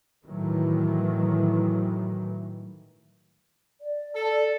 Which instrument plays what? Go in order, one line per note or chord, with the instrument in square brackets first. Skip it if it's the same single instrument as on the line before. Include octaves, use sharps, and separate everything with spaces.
[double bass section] A2 D#3 E3 F#3
[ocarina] D5
[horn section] A4